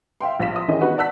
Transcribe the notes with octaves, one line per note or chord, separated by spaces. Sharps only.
E5 F5 G5 C6
A#1 F5 A#6 B6 E7
C6 D#6
D#3 E3 C#4 D#4 G#4 D#5
B3 D#4 F#4 B4 F#5
D5 F#5 A5 E6 F#6 B6